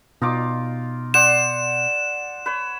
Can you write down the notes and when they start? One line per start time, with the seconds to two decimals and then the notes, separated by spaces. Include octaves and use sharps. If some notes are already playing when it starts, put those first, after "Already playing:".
0.22 B2 D#4 F4 D6
1.14 C5 D5 F#5 E7
2.46 B4 C#5